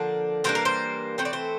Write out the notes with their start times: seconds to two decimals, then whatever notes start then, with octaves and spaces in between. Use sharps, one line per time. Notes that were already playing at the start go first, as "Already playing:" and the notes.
Already playing: D3 F3 A#3 D4
0.44 E3 G3 A#3 D4 C5
0.55 A#4
0.65 C5
1.18 E3 A3 C4 C5
1.25 D5
1.33 C5